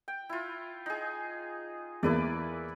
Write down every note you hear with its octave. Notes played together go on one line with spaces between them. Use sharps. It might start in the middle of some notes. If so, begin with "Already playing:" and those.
G5
E4 F4
D#4 G#4
E2 A#3 E4 B4 D5